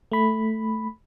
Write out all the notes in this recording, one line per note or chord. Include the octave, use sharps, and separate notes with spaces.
A3 B5